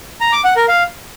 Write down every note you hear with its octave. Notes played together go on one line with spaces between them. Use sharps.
A#5
D6
F#5
A#4
F5